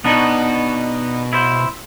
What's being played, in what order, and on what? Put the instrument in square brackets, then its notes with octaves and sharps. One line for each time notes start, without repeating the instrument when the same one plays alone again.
[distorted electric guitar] B2 [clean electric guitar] B3 D4 D#4
[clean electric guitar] E4 C5